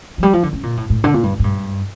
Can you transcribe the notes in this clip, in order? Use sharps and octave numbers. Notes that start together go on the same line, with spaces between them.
F3
G3
F3
D3
C#3
A#2
A2
A2
D3
A#2
G2
A2
G2